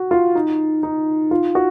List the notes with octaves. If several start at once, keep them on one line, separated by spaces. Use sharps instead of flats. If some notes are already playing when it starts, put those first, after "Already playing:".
Already playing: F#4
F4
D#4
D#4
F4
F#4